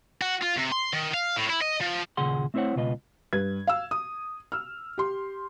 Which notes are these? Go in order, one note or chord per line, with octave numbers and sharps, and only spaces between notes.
F#4
F4
C3
C6
D#3
F5
A2
E4
D#5
F3
D#2 A#2 C#3 G#4 F#5 C6
A3 C4 E4 C5 C#5 F#5
C#2 B2 F4 B4 D#5
G2 B4 G#6
F5 E6
D#6
E6 F6
G4 C6